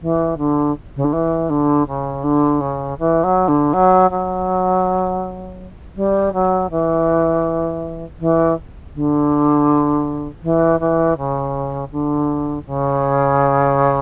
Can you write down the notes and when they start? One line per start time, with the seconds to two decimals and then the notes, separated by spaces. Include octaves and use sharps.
0.01 E3
0.38 D3
0.96 C#3
1.04 D3
1.13 E3
1.49 D3
1.87 C#3
2.23 D3
2.60 C#3
2.99 E3
3.23 F#3
3.48 D3
3.73 F#3
4.10 F#3
5.96 G3
6.33 F#3
6.71 E3
8.19 E3
8.94 D3
10.43 E3
10.80 E3
11.17 C#3
11.92 D3
12.66 C#3